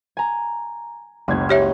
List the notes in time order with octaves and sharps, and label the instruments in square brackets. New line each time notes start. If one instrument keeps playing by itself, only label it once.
[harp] G#5 A#5
[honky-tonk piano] F#1 G#6 [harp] C#2
[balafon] G4 C#5 E5